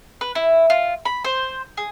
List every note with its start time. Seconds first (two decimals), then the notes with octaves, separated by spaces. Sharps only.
0.21 B4
0.35 E4
0.70 F4
1.05 B5
1.24 C5
1.77 G#4